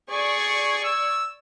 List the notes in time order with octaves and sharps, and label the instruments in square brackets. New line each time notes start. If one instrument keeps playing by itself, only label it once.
[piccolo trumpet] G#4 [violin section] D5 C#6 G#6
[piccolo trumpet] E6